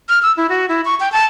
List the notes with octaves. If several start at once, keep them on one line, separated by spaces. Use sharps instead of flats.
F6
E6
E4
F#4
E4
C#6
G5
A5